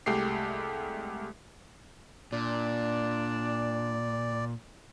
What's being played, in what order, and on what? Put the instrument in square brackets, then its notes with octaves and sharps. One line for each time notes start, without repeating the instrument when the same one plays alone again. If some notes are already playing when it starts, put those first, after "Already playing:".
[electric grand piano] C2 G#3 A3 G4 C7
[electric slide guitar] A#2 [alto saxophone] D4 [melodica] D5